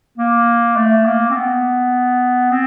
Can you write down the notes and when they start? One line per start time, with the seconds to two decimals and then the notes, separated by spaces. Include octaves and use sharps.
0.18 A#3
0.76 A3
1.05 A#3
1.30 C4
1.35 B3
2.51 C4